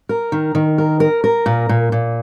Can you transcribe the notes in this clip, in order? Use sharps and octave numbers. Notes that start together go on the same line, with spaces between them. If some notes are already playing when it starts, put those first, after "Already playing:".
A#4
D#3
D#3
A#4
A#4
A#4
A#2
A#2
A#2